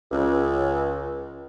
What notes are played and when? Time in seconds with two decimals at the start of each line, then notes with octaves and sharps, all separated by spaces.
0.11 C#2